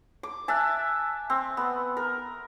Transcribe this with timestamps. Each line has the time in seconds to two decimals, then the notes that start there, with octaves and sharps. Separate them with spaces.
0.23 D6
0.48 E5 G#5 A5 F#6
1.30 C4
1.57 B3
1.97 A#4